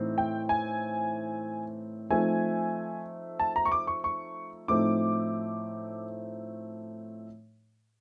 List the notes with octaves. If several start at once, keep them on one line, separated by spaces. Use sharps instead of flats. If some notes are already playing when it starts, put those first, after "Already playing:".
Already playing: A2 E3 A3 C4 D#4
G5
G#5
F3 A3 C4 D#4 G#5
A5
A#5
C#6
D6
C#6
C#6
A2 F3 A3 C4 D#4 D6